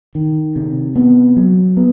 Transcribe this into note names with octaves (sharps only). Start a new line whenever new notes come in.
D#3
C3
B3
F#3
B3